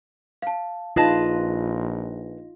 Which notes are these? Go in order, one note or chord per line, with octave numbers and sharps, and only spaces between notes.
F5 A5
A#1 D#4 F4 G#4 B4 D#5 A5 A#6